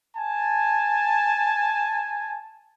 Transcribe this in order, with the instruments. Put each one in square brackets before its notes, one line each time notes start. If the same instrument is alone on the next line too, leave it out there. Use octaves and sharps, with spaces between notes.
[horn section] G#5 A5